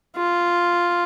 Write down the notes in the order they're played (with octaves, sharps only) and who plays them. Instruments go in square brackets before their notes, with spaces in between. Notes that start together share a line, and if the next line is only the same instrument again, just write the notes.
[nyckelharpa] F4